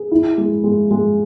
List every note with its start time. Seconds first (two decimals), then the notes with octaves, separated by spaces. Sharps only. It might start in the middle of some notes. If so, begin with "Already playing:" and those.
Already playing: G#4
0.11 E4
0.38 G#3
0.64 G#3
0.91 G#3